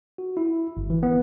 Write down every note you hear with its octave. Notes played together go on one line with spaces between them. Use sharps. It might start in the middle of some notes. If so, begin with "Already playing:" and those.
F#4
E4
G1
E3
B3